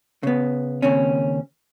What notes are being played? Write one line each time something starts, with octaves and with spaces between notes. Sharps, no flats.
C#3 B3
D#2 C#3 C4 C#4